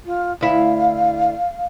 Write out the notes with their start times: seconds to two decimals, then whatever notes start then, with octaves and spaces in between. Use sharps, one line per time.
0.05 F4
0.41 D2 E4 F5